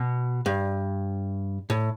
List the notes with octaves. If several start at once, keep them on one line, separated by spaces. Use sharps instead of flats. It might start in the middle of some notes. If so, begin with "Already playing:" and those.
Already playing: B2
G2
A2